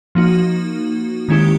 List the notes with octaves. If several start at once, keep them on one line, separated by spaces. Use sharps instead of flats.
F3 A#3 D#4 F#4
D#3 G#3 C#4 E4 G4